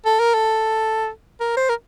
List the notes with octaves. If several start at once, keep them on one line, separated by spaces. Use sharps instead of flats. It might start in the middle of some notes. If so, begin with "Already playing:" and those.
A4
A#4
A4
A#4
C5
A#4